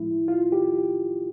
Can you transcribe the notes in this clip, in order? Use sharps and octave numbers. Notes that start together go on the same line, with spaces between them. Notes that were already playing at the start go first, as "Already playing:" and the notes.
Already playing: A2 F3 G#3 E4
F4
G4